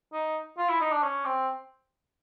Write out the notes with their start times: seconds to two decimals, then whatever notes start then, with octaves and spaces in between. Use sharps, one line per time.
0.13 D#4
0.58 F4
0.69 E4
0.81 D#4
0.92 D4
1.03 C#4
1.25 C4